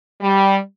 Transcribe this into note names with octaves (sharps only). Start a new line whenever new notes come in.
G3